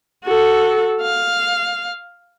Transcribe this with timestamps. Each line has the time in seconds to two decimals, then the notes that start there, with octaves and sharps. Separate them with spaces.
0.25 F#4 A4
1.01 F5